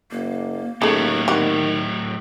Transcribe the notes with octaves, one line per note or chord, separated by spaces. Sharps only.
F#1 A#3
D#2 A2 C#3 F#3 A3
D#3 G3 C4 F#4